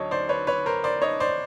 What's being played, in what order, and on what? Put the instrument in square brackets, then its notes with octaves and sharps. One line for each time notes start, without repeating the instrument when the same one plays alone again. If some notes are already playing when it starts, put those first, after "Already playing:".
Already playing: [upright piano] D2 D3 F#3 A4 C#5 D#5
C5 D5
B4 C#5
B4 C#5
A#4 C5
C5 D5
C#5 D#5
C5 D5